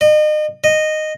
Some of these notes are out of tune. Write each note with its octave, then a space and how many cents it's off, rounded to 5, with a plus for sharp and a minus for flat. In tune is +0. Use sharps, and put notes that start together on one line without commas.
D#5 -35
D#5 -10